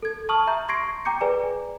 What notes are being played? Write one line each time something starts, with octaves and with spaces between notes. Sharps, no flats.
A4 G#6
A5 C#6 D#6 F6 F#7
E5 A#5 G6
C6 C#6 G#6 A#6 C7 D7
G5 A#5 D6 G6 C#7
G#4 B4 D5 G#5 A#5